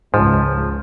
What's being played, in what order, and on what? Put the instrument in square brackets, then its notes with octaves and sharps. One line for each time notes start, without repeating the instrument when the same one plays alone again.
[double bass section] C#2 C#3 [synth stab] G#2 [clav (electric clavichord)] F3